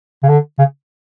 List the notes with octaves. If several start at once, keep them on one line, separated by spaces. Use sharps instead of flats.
C#3
D3
C#3